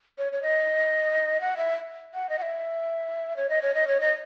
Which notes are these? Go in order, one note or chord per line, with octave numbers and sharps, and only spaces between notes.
C#5
C#5
D#5
F#5
E5
F#5
D#5
F#5
E5
C#5
D#5
C#5
D#5
C#5
D#5